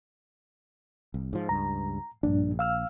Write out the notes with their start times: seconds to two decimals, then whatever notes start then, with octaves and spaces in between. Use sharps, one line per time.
1.14 C2
1.33 G#2 F3
1.49 C#2 G2 A#5
2.23 A#1 G2 D4
2.59 F5 E6 F6